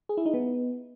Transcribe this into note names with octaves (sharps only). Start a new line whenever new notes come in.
G#4
E4
D#4
B3